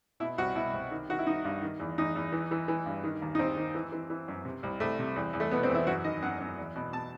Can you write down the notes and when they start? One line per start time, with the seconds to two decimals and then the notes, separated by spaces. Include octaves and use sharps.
0.20 B2 E4
0.38 C2 F#4
0.55 B2 E4
0.73 C2
0.91 D#3
1.10 D#3 F#4
1.19 E4
1.27 D#3 D#4
1.44 G2
1.62 D#3
1.80 E2
1.98 E2 D#4
2.15 E2
2.32 E3
2.51 E3
2.68 E3
2.86 G2
3.04 D#3
3.22 D#2
3.35 D#4
3.39 D#2 C4
3.56 D#3
3.75 E3
3.92 E3
4.10 E3
4.28 F#2
4.45 C3
4.63 C2
4.80 C2 A3
4.99 C3
5.16 E2
5.33 E2
5.40 A3
5.51 B2 B3
5.63 C4
5.70 E2
5.75 E4
5.87 F#2 F#4
6.04 D#3 D#5
6.22 F#2 F#5
6.40 F#2
6.58 E2
6.76 B2
6.93 B2 A5